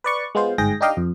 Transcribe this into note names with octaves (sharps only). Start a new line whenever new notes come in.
B4 D5 C#6
G#3 B3 F4 C5
G1 G#2 G#4 G5 A#6
D4 D#4 G4 D#5 F5 G5
F2